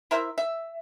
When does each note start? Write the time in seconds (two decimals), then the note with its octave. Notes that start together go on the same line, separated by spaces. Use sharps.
0.11 E4 A#4 C5 E5
0.38 E5